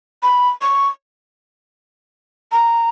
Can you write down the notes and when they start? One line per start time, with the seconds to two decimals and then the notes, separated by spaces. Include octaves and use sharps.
0.23 B5
0.61 C#6
2.52 A#5